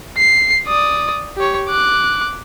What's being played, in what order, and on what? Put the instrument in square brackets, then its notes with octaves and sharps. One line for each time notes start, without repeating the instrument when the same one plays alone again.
[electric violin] C7
D5 D#6
G4 C#5
D6 F#6